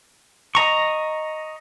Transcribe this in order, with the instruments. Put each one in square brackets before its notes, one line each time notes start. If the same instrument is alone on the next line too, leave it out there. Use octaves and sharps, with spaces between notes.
[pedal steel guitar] D#5 A#5 C#6